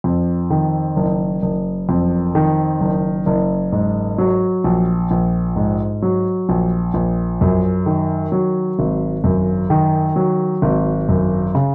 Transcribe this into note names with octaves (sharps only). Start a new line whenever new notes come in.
F2
D#3
F#1
F#1
F2
D#3
F#1
F#1
G#2
F#3
A#1
A#1
G#2
F#3
A#1
A#1
F#2
D#3
F#3
G#1
F#2
D#3
F#3
G#1
F#2
C#3